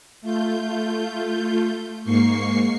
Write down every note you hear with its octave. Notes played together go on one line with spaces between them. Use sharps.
A3 F4 G6
G#2 A#3 C#6 C7